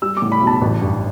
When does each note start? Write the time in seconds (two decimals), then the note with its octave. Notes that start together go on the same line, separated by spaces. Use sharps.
0.02 G3 E6
0.17 D6
0.22 A2
0.32 B5
0.41 B1
0.47 A5
0.61 A1
0.81 G2